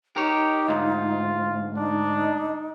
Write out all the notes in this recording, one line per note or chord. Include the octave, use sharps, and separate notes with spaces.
D#4 G4 A#4 C#5
D2 G#2 F4
D4 D#4